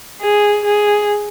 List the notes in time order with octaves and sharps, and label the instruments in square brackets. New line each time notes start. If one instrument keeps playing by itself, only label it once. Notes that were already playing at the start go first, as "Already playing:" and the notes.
[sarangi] G#4
G#4